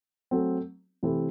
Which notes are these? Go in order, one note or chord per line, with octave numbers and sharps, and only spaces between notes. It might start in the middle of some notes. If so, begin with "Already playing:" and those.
F#3 A3 C4
C3 E3 A3 C4